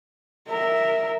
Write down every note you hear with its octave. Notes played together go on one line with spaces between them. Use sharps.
A#4 E5